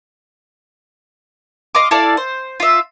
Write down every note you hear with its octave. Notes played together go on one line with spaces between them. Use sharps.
D#5 F5 C6 D6
E4 A4 D5 F5
C5
F4 E5